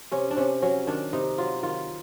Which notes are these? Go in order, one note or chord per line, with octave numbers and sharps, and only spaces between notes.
C3 C#4
D4
C3 C#4
F#3 C#4
D#3 D4
C3 D#4
F#3 F4
D#3 F4